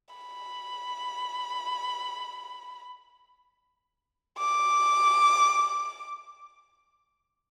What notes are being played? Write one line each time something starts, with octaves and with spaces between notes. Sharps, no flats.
B5
D6